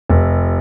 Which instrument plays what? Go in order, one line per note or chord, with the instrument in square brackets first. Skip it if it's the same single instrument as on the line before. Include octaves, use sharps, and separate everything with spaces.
[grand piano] F1